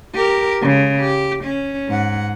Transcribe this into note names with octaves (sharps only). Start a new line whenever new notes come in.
G4 A#4
C#3 G#3
G4
C#4
G#2 F#5